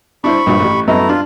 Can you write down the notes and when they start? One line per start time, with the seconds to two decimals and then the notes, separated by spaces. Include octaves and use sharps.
0.24 D4 E4 C5 B5 C#6
0.46 A#1 G2 F3
0.60 A1 G4
0.88 F#2 A3 B3 E4 D#5 A#5
1.09 D4 F4